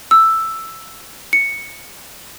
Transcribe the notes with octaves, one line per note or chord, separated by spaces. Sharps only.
E6
C#7